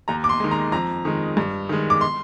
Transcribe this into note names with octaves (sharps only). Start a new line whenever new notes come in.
D#2 A#5
D6
C6
D#3 G#3
A#5
F2 A#5
D#3 G#3
G2
D#3 G#3
D6
C6